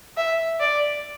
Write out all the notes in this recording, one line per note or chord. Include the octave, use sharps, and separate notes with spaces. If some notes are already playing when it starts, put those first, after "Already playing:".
E5
D5